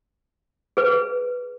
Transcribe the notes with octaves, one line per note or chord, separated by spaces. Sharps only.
G#4 B4